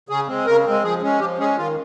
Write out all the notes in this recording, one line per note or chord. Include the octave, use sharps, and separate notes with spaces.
C#3 G#4
G#3 C4
C#3 A#4
G#3 C4
F3 G#4
G#3 C#4
F3 G4
G#3 C#4 G#4
D#3 F4